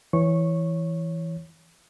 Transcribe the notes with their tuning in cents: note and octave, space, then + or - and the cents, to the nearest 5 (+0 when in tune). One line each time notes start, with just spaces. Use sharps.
E3 +0 C#5 +0 C#6 -15